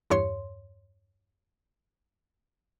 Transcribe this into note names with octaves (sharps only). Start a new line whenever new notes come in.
E2 G2 C#5 C6